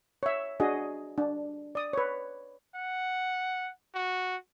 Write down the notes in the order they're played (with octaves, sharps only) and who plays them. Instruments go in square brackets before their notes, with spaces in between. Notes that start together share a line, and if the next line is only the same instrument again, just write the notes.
[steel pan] C#5 E5
D4 F#4 G#4 D#5
D4
D5 D#6
B4 C#5
[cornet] F#5
F#4